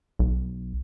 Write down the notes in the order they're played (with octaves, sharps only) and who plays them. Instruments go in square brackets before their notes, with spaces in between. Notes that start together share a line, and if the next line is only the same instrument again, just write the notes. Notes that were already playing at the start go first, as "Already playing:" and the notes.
[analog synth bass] B1